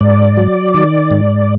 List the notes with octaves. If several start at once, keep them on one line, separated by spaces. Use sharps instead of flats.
G#2 D5
F#3
D#3
G#2